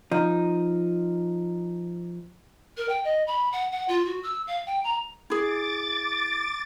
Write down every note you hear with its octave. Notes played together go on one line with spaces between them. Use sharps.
F3 D#4
A#4
G5
D#5
B5
F#5
F#5
F4
F#4
E6
F5
G5
A#5
E4 G#4 D6 A6